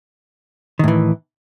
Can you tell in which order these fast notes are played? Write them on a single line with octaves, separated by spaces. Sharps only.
D#3 A2 E3